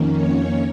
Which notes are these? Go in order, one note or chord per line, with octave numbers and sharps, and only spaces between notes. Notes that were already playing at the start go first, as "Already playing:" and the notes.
Already playing: F2 D#3 A#3 C#4
C#5